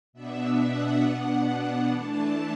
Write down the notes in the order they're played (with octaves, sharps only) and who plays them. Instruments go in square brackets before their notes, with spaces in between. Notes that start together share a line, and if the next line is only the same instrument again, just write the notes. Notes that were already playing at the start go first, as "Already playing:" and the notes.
[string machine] B2 B3 D4 E5
F#5
B2 B3 D4 F#5
E3 A3 D4 A5